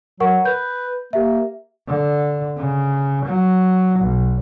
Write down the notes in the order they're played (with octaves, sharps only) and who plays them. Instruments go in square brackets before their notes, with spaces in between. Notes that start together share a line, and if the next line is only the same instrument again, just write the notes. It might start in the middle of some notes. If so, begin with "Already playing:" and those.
[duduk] F#3 [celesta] A#4 F#5 C#6
[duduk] B4 [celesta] G6
[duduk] A#3 [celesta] G4 E5
[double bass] D3
C#3
F#3
B1